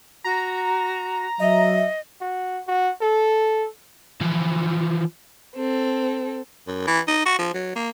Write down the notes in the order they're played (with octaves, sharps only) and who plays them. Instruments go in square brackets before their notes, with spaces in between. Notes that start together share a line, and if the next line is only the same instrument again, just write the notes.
[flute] F#4 [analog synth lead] A#5
[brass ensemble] F#3 E5 [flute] D#5
[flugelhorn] F#4
F#4
A4
[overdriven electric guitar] E3 F3
[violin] C4 A4
[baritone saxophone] F#2
E3
D#4
F#4
F3
F#3
A#3